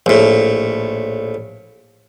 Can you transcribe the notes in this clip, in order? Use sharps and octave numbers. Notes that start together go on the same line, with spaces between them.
A#1 A2